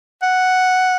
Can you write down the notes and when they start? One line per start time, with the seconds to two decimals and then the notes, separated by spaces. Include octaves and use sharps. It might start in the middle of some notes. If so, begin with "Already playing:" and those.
0.22 F#5